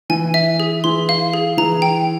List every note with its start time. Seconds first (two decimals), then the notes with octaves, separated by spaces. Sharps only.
0.10 E3 G#5
0.34 E5
0.60 G#4
0.84 E3 C6
1.09 F5
1.33 G#4
1.57 E3 A#5
1.82 G5